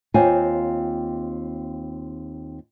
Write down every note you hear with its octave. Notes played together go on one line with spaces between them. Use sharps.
D#2 C4 F4 C#5 F5 G#5